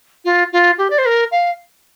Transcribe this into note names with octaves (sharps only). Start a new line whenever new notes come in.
F4
F4
G4
D5
C5
A#4
F5